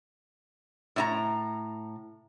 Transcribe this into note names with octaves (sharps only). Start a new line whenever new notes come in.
A2 D#4 A#5